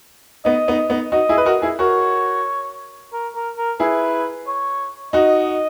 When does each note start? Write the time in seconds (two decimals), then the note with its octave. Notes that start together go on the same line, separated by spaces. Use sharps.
0.45 B3 D#4 D#5
0.68 B3 D#4
0.90 B3 D#4
1.12 D#4 F#4 D#5
1.29 E4 G#4
1.38 B4
1.46 F#4 A#4
1.62 E4 G#4
1.79 F#4 A#4 C#5
3.13 A#4
3.35 A#4
3.57 A#4
3.80 E4 G#4 B4
4.47 C#5
5.13 D#4 F#4 D#5